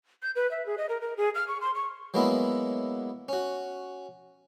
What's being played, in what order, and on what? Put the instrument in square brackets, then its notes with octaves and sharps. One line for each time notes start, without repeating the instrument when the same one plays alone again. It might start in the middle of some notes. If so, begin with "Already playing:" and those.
[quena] G6
B4
E5
G#4
D#5
A#4
A#4
G#4
F6
C#6
C6
C#6
[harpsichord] F#3 G#3 A#3 B3 E4
C#4 F#4